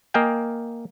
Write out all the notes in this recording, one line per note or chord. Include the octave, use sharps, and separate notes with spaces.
A#3 D#5 F5 G5 G#5